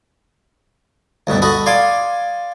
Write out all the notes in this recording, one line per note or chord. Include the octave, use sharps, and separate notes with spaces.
D2 G2 B2 G3
F#4 A4 D#5 B5
D5 F5 G#5 C6 D6